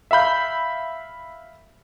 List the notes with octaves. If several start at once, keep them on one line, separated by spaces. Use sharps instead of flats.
E5 F5 B5 G6